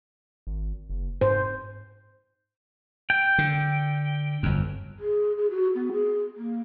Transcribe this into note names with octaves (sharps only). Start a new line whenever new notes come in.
G#1
F#1
G#2 C5
G5
D3
G1 F2
G#4
G#4
F#4
B3
G#4
A#3